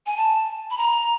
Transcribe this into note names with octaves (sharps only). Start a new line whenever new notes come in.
G#5
A5
B5
A#5